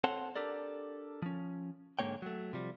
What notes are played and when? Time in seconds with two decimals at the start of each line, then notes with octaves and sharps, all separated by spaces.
0.04 C4 A4 C#5 F#5 A5 C6
0.36 D4 G4 A4 A#4 D5
1.22 F3 C#4
1.99 G#2 D3 G#3 A#3 C#5 G5
2.22 F#3 A3
2.53 C3 F3 G3